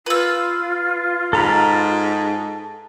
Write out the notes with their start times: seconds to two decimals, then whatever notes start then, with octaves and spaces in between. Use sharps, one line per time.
0.06 F4 B4 E6
1.33 G#2 A4 A#5 B5